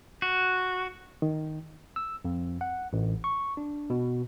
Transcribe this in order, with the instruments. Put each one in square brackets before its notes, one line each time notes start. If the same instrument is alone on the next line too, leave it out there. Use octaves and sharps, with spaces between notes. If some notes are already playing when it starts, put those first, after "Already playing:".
[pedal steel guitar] F#4
[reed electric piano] D#3
[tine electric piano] E6
F2
F#5
A1
C#6
D4
B2